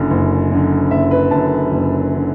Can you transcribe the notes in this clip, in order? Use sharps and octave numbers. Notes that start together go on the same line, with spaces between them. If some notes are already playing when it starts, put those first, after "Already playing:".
Already playing: F#1 F#2 D3
F#1
F#2 D3
F#1 E5
B4
F#2 D3 A5
F#1
D3